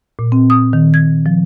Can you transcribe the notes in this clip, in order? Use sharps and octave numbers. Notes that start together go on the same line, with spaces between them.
A#2
C4
D#6
D#3
G#6
F3